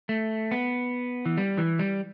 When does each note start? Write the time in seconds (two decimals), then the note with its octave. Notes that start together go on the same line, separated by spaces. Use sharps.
0.09 A3
0.51 B3
1.26 E3
1.37 G3
1.58 E3
1.79 G3